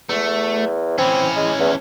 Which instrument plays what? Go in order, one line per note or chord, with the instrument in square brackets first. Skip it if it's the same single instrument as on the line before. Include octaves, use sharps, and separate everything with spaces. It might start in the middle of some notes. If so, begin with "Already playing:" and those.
[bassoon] E2 [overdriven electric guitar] A3
[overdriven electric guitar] E3 C#4 [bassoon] C4
[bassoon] G#3
E2